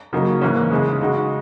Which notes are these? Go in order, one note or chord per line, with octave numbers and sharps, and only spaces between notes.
C#3 F#3 A#3 D#4
G#2 E3 A#3 C#4
C#3 G#3 D#4 G#4
C#3 G#3 D#4 F#4